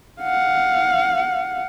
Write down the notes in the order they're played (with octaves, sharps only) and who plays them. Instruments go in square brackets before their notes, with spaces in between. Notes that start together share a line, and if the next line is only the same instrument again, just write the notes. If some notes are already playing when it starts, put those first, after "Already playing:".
[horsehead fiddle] F5 F#5